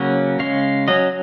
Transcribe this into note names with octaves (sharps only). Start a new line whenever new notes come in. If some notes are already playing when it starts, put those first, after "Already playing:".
Already playing: C#3 F#3 A#3 C#4 F#5
C#3 G#3 C#4 F5
F#3 C#4 D#5